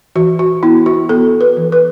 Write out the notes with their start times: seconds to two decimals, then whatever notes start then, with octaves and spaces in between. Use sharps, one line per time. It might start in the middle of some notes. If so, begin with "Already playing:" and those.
0.16 E3 F#4
0.39 F#4
0.63 B3 E4
0.86 F#4
1.09 B3 A4
1.41 B4
1.57 E3
1.72 B4